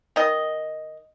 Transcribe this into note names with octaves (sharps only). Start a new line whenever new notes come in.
D#3 D#5